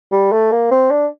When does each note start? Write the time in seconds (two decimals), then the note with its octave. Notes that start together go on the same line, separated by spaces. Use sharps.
0.12 G3
0.32 A3
0.52 A#3
0.71 C4
0.91 D4